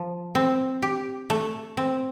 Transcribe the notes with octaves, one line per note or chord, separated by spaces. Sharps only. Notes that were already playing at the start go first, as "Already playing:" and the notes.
Already playing: F3
C4
G4
A3
C4